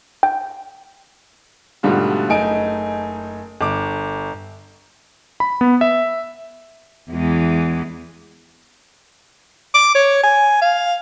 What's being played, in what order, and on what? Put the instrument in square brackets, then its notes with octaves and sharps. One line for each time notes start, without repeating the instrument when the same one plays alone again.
[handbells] G5
[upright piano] G#2 B2 D3 G3 A3 F4
F#1 A3 D#4 G#5 D7
G1 D6
[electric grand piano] B5
B3
E5
[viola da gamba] E2 E3 G#3
[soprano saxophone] D6
C#5
G#5
F5